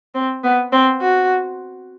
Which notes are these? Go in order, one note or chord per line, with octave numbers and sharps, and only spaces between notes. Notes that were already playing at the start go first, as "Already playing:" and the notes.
C4
B3
C4
F#4